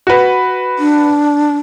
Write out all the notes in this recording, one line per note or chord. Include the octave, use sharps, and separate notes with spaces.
F#4 B4
D4